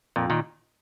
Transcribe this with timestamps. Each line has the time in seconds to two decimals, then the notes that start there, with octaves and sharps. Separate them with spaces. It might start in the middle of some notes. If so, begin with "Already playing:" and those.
0.16 F2 A#2
0.30 A#2 D#3